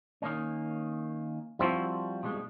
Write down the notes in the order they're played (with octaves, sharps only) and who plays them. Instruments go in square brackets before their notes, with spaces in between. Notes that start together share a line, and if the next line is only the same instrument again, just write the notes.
[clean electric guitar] D#3 A#3 C#4
[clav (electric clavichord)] F3 C4 E4 [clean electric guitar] G3 F#4
[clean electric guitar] B2 G3 G#3